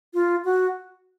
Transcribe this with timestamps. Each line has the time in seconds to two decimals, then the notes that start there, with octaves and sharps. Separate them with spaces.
0.14 F4
0.44 F#4